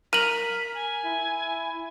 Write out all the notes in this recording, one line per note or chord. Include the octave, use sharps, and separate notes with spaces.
A#4 B6 D#7 F#7
G#5
E4